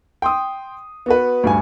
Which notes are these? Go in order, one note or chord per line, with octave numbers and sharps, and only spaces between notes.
G5 C6 D#6
B3 F#4 B4
D2 G2 G#5